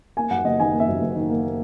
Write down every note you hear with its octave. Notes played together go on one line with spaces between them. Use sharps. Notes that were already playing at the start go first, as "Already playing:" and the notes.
A#3 G#5
F#2 F#5
F#1 D#5
D#3 G#5
A#3
E5
F#2
F#1
D#3
A#3